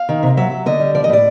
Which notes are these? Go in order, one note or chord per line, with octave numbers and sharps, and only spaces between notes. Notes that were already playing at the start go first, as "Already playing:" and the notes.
Already playing: F5
D#3
C3
F#3 E5
F#3
D3 D#5
G3
F3 D5
D#5
A2 D5